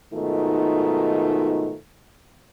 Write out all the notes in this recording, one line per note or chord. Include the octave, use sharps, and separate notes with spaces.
G#2 B2 D#3 A3 D#4 F4